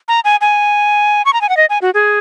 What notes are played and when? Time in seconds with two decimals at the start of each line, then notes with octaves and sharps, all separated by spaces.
0.08 A#5
0.24 G#5
0.41 G#5
1.26 C#6
1.33 A#5
1.41 G#5
1.49 F#5
1.57 D#5
1.70 G#5
1.82 F#4
1.94 G#4